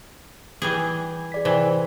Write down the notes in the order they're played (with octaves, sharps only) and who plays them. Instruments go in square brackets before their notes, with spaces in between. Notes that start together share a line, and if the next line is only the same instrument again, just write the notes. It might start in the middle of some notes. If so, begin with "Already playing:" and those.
[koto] E3 G3 G#4
[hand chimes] G#4 D5 B6
[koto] C3 E3 [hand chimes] C5 G#5